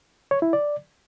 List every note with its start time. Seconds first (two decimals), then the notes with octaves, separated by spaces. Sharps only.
0.31 C#5
0.42 E4
0.53 D5